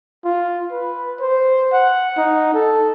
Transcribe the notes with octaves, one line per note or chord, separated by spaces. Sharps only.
F4
B4
C5
F#5
D#4
A4